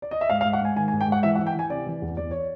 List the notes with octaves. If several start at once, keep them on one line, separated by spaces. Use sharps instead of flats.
D5
D#5
E5
G#2 F5
F5
G#2
F#5
G#2 G#5
D#3 G#5
G#5
G#2
G5
G#2 F#5
E3 E5
F#5
E3
G5
E3 G#5
C3 D5
E3
E2
E2 D5
C#5